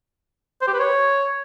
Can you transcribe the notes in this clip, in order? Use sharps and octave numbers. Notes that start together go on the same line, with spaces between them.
C5
G4
B4
C#5